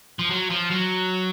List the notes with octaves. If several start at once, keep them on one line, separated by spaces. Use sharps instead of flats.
F3
F#3
F3
F#3